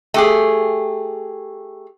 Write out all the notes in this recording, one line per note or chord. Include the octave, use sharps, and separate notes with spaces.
A3 G4 G#4